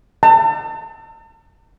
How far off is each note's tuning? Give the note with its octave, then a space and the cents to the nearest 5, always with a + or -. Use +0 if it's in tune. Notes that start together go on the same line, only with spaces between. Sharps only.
A5 +45